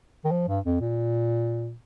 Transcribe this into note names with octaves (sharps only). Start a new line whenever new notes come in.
D#3
F3
G2
F2
A#2